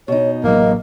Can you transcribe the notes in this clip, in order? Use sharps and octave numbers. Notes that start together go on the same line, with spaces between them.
B2 D#4 C#5
A1 F#3 A#3 D#5